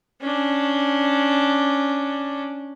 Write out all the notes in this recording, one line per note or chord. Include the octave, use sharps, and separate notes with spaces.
C#4 D4